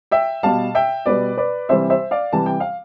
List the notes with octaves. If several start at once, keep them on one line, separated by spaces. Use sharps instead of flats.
E5 G5
B2 G3 F5 A5
E5 G5
B2 G3 B4 D5
B4 D5
C3 E3 G3 C5 E5
C5 E5
D5 F5
C3 E3 G3 A5
G5
F5